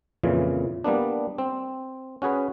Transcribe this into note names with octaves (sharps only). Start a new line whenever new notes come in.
F2 A#2 C#3 E3
G3 A#3 B3 D4
C4
C#4 F#4 G#4 B4